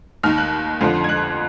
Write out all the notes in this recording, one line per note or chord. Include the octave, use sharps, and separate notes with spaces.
D#2 D#3 F6
F#6
F2 D3 F3
G#6
F#6